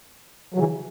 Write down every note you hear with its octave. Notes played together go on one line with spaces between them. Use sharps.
F#3
C#3 E3